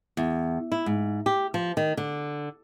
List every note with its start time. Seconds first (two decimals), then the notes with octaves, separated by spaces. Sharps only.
0.17 E2
0.72 E4
0.86 G#2
1.26 G4
1.54 F3
1.77 D#3
1.97 D3